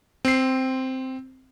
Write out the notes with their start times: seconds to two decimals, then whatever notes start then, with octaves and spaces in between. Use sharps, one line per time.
0.25 C4 C7